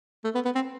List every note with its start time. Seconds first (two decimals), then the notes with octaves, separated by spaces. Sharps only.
0.24 A3
0.35 B3
0.45 B3
0.55 C4